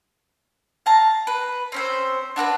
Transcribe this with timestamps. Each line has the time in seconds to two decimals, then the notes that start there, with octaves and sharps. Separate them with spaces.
0.86 F5 A5 A#5
1.27 B4
1.72 C4 C#4 C5
2.36 D4 F#4 A#4 B4